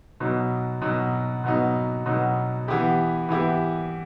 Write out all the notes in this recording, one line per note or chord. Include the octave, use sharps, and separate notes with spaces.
B2 F#3 B3 D#4
B2 F#3 B3 D#4
B2 F#3 B3 D#4
B2 F#3 B3 D#4
E3 B3 E4 G4
E3 B3 E4 G4